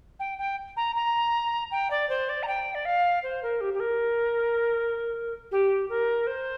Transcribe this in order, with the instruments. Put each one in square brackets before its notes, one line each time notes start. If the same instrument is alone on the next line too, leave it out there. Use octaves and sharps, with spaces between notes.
[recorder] G5
G5
A#5
A#5
G5
D5
C5
D5
A#5
G5
D5
F5
C5
A#4
G4
G4
A#4
G4
A#4
C5